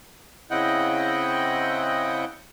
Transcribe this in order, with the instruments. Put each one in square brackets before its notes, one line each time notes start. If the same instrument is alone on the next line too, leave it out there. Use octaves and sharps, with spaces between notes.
[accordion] C#3 C4 E4 D#5 F#5 G5